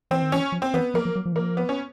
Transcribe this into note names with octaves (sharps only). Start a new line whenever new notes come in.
E3 C4
D#3
E3 C#4
F3
C4
E3 B3
F3 A#3
F3
F#3
F3
E3
F3 A#3
B3
C#4